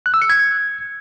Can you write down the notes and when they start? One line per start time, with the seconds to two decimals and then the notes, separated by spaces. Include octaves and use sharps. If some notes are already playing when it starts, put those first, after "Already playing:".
0.06 F#6
0.14 E6
0.22 C#7
0.30 G#6